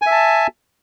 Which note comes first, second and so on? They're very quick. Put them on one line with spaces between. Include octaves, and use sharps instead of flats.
G#5 E5 A5